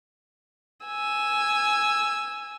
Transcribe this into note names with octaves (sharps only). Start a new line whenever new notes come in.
G#5 E6